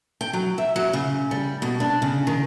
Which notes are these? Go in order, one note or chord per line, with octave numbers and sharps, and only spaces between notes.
G5
F#3
E5
F#3
C#3
G3
B2
D4
C#3
D#3